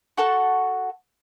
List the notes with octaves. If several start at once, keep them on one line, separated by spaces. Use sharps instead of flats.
F#4 A4 F#5 C#6